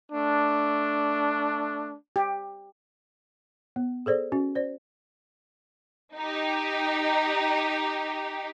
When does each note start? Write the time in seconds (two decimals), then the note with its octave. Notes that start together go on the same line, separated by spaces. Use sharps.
0.11 A3 D4
2.16 G4
3.76 B3
4.06 G#4 A4 C5 D5
4.32 C#4 F#4
4.55 C5 D5
6.17 D#4 G4